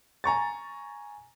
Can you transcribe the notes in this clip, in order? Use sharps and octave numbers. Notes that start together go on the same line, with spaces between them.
G#5 A#5 C#6 A6